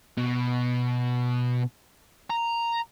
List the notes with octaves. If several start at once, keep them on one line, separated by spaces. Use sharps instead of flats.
B2
A#5